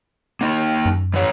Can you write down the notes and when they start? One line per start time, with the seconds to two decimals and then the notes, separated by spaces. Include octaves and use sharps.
0.41 A#3 D#4
0.86 F#2
1.14 E3 C#5